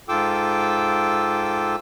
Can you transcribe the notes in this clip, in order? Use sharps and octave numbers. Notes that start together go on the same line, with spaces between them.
G#2 F4 A4 G5 D6 E6